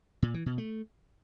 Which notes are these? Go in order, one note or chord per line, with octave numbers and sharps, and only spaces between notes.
A#2
E3
B2
A3